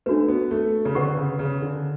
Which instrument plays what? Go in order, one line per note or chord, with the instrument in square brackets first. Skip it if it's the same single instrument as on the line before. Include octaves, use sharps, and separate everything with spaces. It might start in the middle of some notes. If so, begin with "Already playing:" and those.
[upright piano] A3 [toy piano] D4 F#4 B4
[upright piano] B3
A3
C#3
[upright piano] D3 [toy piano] B4 F#5 C#6
[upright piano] C#3
C#3
D3